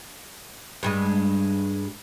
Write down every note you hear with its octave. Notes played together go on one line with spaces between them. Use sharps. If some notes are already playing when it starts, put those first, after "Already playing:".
G2 G3 G#3